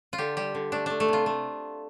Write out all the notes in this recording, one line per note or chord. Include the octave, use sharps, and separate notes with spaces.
F4
D3 G4
G3 G4
D3
A3 D4
A3 D4
A3
C3 F4
A3